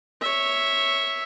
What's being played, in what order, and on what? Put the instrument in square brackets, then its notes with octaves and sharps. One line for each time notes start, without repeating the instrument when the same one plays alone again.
[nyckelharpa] C#5 E5